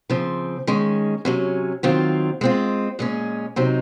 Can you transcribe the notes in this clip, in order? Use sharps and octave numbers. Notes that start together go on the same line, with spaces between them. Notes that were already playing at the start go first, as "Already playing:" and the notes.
C#3 F3 C4
D#3 G#3 C#4
C3 F#3 C#4
D#3 F#3 C4 F4
G#3 C4 F4
A#2 G#3 C#4
C3 F#3 C4 D#4